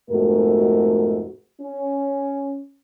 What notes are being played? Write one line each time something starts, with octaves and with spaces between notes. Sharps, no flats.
F2 G#2 B2 A3 F#4 A#4
C#4